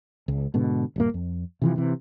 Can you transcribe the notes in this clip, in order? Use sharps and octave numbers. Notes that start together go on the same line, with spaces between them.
C#2
G#2 B2 D3
D#1 G2 A#3
F2
C3 E3 F3
C3 E3